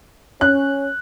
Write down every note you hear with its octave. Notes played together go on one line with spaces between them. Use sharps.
C#4 F#6